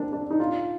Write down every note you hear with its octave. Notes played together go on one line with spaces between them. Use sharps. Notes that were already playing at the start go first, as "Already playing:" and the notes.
Already playing: A#3 C4 D4
D4
D#4
F4